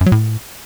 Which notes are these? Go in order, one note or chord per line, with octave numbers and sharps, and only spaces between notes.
F#2
F#3
A2